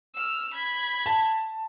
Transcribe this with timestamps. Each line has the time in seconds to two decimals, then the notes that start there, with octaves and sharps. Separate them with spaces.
0.14 E6 F6
0.54 B5 G#6
1.06 A5